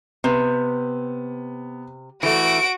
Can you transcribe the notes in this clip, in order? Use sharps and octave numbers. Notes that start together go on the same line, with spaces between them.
C3 B3
E3 A3 F#4 D7